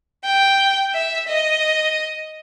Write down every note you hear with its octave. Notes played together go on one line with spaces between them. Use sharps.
G5
E5
D#5